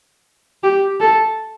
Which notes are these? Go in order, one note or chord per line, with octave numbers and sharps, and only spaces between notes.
G4
A4